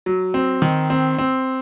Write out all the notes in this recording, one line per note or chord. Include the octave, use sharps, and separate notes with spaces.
F#3
C4
D#3
C4
C4